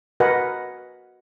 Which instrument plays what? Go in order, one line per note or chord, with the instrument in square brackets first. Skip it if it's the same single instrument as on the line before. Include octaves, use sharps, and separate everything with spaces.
[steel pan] F#4 A#4 B4 D#5 F#5 G#5